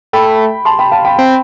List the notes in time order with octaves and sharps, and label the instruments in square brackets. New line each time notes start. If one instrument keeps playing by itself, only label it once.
[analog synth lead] A3 [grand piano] G5 B5
[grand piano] A5 C6
G5 B5
F5 A5
G5 B5
[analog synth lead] C4